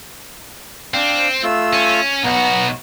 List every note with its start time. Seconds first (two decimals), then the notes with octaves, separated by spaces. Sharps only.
0.94 C4 D4 F5
1.43 A3 F4 E6
1.73 C#4
2.24 B1 B3 F#4 A#5